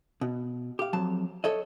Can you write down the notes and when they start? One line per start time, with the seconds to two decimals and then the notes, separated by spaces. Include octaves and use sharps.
0.21 B2
0.79 G4 F5
0.93 F2 F#3 A5
1.44 A4 C#5 D#5